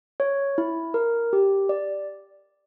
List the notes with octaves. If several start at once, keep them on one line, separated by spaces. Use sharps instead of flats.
C#5
E4
A#4
G4
D5